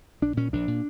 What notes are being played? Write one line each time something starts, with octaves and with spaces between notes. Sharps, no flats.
A#1 D4
A#2 C#4
A#1 D4
A#2